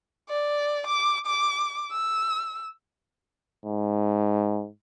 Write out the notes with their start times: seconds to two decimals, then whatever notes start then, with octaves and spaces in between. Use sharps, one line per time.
0.29 D5
0.87 D6
1.26 D6
1.92 E6
3.66 G#2